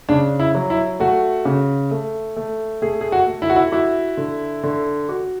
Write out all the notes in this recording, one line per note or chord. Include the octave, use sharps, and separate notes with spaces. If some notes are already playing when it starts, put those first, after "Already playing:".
C#3 D4
E4
F#3
E4
A3 F#4
C#3
A3
A3
A3 G#4
G#4
F#4
A3
E4
F#4
E4
E4 F#4
D3
D3
F#4